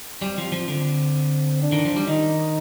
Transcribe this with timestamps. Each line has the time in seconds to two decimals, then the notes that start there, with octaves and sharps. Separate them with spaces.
0.21 G3 C4
0.38 F3
0.52 F3
0.68 D3
1.62 D4
1.72 D#3
1.85 F3
1.96 G3
2.07 D#3 D#4